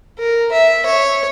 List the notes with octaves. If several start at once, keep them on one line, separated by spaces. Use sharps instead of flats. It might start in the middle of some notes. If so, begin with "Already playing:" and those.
A#4
E5
C#5